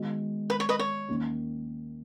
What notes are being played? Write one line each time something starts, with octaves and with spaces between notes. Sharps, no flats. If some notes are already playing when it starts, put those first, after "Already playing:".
Already playing: D#3 G#3 B3 F#4
B4
C#5
B4 D#5
C#5
D#2 D#3 A#3 C#4